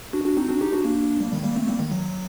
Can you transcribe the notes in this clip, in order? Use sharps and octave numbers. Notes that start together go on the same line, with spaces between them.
D4 F#4
D4 F#4
C4 D#4
D4 F#4
D#4 G4
D4 F#4
A#3 D4
G3 A#3
D#3 G3
G3 A#3
A3 C4
G3 A#3
D#3
F#3